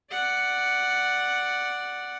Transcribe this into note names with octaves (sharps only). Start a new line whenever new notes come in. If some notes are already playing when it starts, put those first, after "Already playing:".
D5 F#5